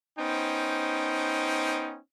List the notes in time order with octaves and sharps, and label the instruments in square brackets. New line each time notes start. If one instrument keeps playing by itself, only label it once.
[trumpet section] B3 C#4 D#4 C5 G5